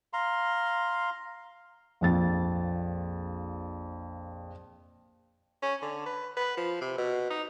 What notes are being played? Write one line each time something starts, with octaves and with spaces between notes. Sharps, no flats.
F5 A#5 C6
A#1 F2 A6
C#4
D3
B4
B4
F3
C3
B2
D#4